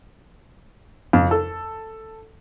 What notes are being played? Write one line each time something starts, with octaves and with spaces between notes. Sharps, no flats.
F2
A4